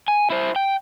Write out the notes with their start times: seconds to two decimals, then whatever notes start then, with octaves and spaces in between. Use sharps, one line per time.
0.08 G#5
0.30 E4 C5
0.56 G5